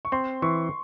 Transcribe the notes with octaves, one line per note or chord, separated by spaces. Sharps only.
C#6
C4 C6
E3 C#6